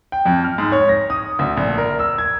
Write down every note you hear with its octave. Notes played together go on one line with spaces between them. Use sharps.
G5
F2
F6
G#2
C#5
A#6
D#6
D2
A#1
A#4
E6
G#6